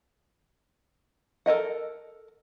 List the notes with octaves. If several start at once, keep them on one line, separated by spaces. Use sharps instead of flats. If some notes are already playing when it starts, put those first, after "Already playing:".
A4 A#4 D#5 F#5